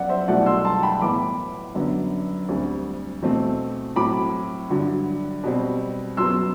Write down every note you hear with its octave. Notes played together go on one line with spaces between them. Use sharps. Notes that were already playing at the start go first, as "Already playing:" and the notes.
Already playing: F#2 F#3 B3 D5 F#5
C5 E5
C2 B2 F#3 A3 D5 F#5
C6 E6
A5 C6
G5 B5
A2 E3 B3 B5 D6
F#2 D3 F#3 B3
D2 D3 G3 C4
E2 B2 A3 C4
A2 F#3 C4 B5 D6
G2 D3 F#3
B2 G3 C4
F#2 F#3 B3 C6 E6